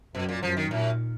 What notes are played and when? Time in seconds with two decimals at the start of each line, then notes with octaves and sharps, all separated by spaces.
0.14 F#2 B2
0.29 A#2
0.43 F#2 F3
0.57 D#3
0.71 F#2 A#2